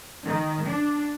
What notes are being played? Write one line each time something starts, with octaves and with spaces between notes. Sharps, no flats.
D#3
D4